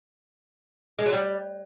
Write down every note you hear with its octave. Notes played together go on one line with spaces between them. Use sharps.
G#3
F#3
G3